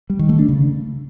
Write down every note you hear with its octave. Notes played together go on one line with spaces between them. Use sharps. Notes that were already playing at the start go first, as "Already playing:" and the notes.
G3
D#3
A3
D4
C#3